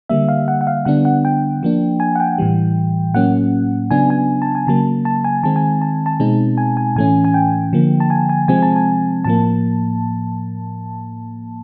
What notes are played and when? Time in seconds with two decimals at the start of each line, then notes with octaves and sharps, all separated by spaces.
0.09 D3 G3 A#3 E5
0.28 F5
0.48 F#5
0.61 F#5
0.67 F5
0.85 D3 G3 B3 D4 F#5
1.05 F#5
1.25 G5
1.63 F3 A#3 D4
2.00 G#5
2.15 F#5
2.20 G5
2.38 A2 E3 G3
3.14 A2 F#3 A#3 C#4 F#5
3.91 C#3 F#3 B3 D4 G#5
4.10 G#5
4.42 A5
4.55 G#5
4.67 C#3 F#3 A#3 A5
5.05 A5
5.24 G#5
5.43 D#3 G#3 C4 A5
5.56 G#5
5.82 A5
6.06 A5
6.20 B2 G#3 C4 D#4
6.58 G#5
6.77 G#5
6.96 A2 E3 A3 C#4 G#5
7.25 G#5
7.34 G5
7.73 D3 F3 A#3
8.00 A5
8.10 G#5
8.29 G#5
8.48 C3 F3 G#3 C4 G#5
8.63 A5
8.76 G#5
9.25 A2 F3 A#3 A5